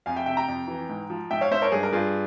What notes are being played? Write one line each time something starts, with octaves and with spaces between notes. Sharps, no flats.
F2 F5 G#5
E5 G5
C3 E5 G5
G5 A#5
F2
E3
G#2
F3
G#2 E5 G5
C#5 F5
G#2 C5 E5
A#4 C#5
G2 G#4
A#4
G2 F4 G#4